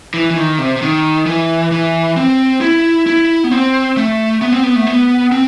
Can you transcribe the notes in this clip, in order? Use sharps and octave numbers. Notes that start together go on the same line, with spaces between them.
E3
E3
D#3
C3
C3
D#3
E3
E3
C4
E4
E4
B3
C4
A3
B3
C4
B3
A3
B3
C4